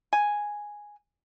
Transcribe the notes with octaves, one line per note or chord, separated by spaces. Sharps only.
G#5